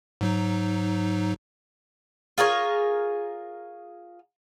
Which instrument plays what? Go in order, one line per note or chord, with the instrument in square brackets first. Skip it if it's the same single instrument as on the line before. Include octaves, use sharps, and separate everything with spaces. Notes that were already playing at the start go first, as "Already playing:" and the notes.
[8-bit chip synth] G#2 F#3 D#4
[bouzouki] F4 G#4 A#4 C#5